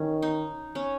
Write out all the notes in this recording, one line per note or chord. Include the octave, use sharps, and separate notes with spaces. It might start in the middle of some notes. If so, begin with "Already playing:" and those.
Already playing: D#3 C#4
D#4
C#4